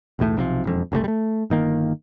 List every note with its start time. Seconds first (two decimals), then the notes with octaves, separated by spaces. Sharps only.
0.19 B1 E2 A2 A3
0.37 B1 C3 D#3 F3
0.64 E1 F2
0.92 F#1 C2 C3 A3
1.04 G3 A3
1.50 G1 D#3 A#3